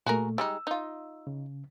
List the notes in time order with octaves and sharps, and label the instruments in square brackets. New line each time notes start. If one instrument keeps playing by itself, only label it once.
[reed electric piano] A#2 A3 [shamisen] F#4 G#4 A#4
[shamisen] G3 G#3 D#4 [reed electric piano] E6
[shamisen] D#4 F4
[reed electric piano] C#3